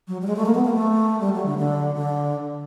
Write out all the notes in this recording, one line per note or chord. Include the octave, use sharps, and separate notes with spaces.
F#3
G3
G#3
A3
A#3
B3
A#3
A3
G3
F#3
D3
D3
D3